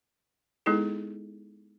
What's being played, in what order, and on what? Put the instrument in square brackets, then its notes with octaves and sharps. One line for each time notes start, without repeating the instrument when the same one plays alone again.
[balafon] G#3 B3 D#4 E4 G#4 A4